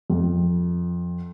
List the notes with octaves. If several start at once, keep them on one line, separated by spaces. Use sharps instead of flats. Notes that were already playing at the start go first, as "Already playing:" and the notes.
F2